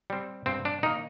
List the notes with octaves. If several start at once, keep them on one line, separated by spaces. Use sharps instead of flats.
G3 C4
G2 C4
D4
D#3 A#3 D#4